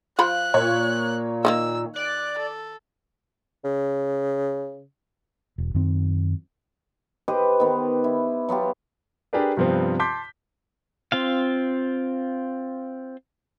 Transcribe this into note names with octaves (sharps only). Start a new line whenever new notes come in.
F3 F4 B5 F#6
A#2 C#5
D#3 F3 A#3 E6
D5 F#6
A4
C#3
E1
F#2 D#3 C4
G4 B4 C5 D#5
D#3 B3
E4
F#3 B3 F4 G4
D4 G4 G#4 A#4 B4 D5
G2 C3 F3 B3 C4
A5 C6 D6 G6 B6
C4 F4 F5